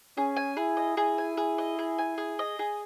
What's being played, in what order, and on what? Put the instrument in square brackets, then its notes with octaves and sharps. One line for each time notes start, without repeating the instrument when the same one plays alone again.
[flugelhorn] C#4 [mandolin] G#4
[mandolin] G#5
[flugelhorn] E4 [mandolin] G#4
[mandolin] D#5
[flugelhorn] E4 [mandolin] G#4
[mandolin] G#5
G#4
D#5
G#4
G#5
G#4
D#5
G#4